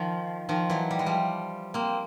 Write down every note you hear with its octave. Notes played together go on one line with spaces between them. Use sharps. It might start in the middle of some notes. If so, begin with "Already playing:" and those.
Already playing: D#3 F3
D#3 F3
E3 F#3
G3
G#3
F3 G3
A#3 C4